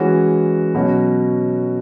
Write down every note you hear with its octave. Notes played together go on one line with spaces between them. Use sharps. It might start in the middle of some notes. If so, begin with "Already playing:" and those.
Already playing: E3 G#3 C#4 F#4
B2 F#3 C#4 F#4